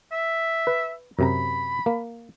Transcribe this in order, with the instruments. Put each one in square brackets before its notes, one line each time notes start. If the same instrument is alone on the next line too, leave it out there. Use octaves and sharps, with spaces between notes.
[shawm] E5
[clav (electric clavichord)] B4
[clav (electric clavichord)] F#2 C3 A#5 [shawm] B5
[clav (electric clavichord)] A#3